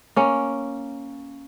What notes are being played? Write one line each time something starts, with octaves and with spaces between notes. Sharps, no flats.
A#3 C#4